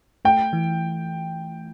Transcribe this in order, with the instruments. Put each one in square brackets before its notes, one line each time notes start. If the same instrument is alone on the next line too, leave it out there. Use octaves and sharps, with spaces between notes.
[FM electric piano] A3 [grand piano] G5
[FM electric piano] E3